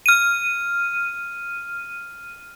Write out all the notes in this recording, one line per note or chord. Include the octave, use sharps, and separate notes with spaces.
F6 D#7